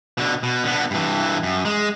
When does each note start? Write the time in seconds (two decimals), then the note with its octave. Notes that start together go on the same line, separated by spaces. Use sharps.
0.18 B2 D3
0.43 B2
0.64 D3 B3
0.91 G2 E3
1.43 F#2
1.65 G#3